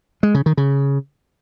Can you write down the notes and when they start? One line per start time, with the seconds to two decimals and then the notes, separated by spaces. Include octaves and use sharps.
0.23 G#3
0.34 C#3
0.46 D#3
0.57 C#3